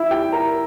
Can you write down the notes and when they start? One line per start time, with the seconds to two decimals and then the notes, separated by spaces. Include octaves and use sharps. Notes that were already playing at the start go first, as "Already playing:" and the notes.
Already playing: E4 E5
0.11 G4 G5
0.32 A#4 A#5